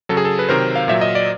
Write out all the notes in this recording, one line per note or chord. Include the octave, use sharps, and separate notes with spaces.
C#3 F#3 A4
G#4
A4
B4
C3 D#3 F#3 A#4 C5
F5
A#2 F#3 E5
D#5
D5